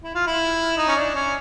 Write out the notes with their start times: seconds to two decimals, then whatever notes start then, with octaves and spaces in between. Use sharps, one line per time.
0.03 E4
0.15 F4
0.27 E4
0.77 D#4
0.88 C#4
0.96 D4
1.14 C#4